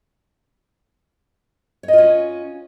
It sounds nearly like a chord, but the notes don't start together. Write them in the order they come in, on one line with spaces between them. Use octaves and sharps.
C#5 D#5 F4 C#4